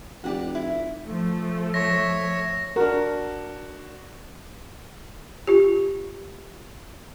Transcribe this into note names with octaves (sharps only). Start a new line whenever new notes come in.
F1 F#4 G4 D5
E4
F3 A3
C#5 E5 A#6
D4 F#4 A#4
F4 G4